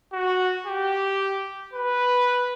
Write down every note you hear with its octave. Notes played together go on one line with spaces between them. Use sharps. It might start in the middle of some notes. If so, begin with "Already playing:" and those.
F#4
G4
B4